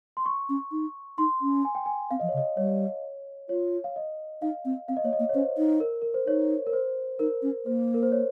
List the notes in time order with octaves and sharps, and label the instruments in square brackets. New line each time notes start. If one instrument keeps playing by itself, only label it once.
[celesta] C6
C#6
[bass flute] C#4
D#4
[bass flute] D#4 [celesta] C6
[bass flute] C#4
[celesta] G#5
G5
G#5
[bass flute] C4 [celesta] F5
[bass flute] F3 [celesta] D#5
[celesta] C#5
[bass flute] C#3
[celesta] D#5
[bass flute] G3 [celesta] C#5
[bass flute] F4 [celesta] C#5
[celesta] F5
D#5
[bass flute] D#4 [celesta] F5
[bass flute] C4
[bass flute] C4 [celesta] F5
[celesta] D#5
[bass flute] A#3 [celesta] C#5
[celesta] D#5
[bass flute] A#3
[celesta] C#5
[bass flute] C#4 [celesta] C5
[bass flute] D#4
[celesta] A#4
A#4
C5
[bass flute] D#4 [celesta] C#5
[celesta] A#4
C5
[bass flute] D#4 [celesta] A#4
[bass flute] C#4
[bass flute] A#3 [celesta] C5
[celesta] A#4
C5
C#5